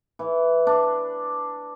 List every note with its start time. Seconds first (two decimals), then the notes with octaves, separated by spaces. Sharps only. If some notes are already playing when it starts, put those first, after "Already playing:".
0.19 E3
0.67 D4